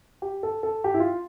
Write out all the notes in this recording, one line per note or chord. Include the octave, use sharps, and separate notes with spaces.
G4
A4
A4
G4
E4
F4